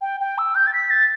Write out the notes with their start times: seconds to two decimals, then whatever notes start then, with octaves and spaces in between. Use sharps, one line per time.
0.02 G5
0.20 G5
0.38 E6
0.55 G6
0.67 A6
0.74 B6
0.90 A6